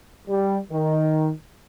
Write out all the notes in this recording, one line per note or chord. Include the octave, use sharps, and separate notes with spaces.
G3
D#3